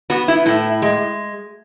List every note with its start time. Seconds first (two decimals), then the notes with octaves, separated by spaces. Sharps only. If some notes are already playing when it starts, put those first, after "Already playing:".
0.10 B3 F#4
0.28 E4
0.46 A2 E4
0.82 G#3